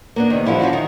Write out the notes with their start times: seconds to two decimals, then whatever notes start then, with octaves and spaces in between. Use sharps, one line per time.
0.16 A#3 B3 D4
0.30 C3 D#3
0.46 D3 F3 G3 E4 G4
0.59 F3 F#3 C#4 F#4
0.73 D#3